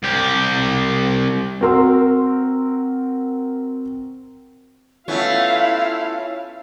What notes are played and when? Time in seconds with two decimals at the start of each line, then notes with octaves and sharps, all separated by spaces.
0.03 C2 G4
1.61 C4 F#4 A#4 C6 E6
5.08 A3 B3 C#4 E4 F4 F5